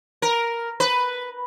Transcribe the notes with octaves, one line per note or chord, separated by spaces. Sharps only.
A#4
B4